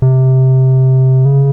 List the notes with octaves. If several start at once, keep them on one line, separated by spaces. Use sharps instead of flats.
C3
C#3